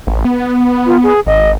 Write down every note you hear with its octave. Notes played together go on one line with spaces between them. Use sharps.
A1
B3
F4
G#4
G#1 D#5